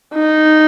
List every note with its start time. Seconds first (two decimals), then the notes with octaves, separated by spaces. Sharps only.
0.15 D#4